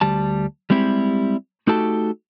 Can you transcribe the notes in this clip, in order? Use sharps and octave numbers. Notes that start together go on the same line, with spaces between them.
D2 G3 A5
G3 G#3 C4 E4 G4
A3 D#4 F#4 G4 A4 A5